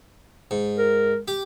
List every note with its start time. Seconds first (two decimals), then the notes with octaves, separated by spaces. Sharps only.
0.51 G#2
0.78 A#4
1.28 G4